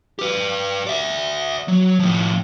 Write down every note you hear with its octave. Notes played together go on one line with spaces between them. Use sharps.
G4 B4
D5 E5
F#3
A2 F3